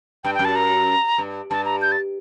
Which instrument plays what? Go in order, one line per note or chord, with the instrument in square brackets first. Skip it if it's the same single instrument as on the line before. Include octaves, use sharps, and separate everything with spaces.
[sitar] G2 [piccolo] G5
[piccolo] G5
[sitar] F#2
[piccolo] A5
A#5
[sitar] G2
[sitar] G2 [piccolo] A5
[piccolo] A#5
G6
A6